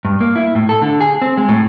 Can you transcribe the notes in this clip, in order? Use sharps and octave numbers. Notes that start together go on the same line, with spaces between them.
G2
A#3
E4
A2
A4
D3
G#4
C4
G#3
A2